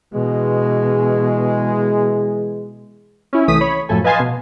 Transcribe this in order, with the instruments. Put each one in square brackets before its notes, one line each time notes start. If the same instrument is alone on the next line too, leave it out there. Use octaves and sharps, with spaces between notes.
[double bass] B2 [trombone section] E3 G#3
[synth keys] C#4 E4
C2 E3 A3 D#6 B6
C#5 B5
F#2 A2 F3 A3 A4 G#5
B4 D#5 F5 G#5 A5 C6
B2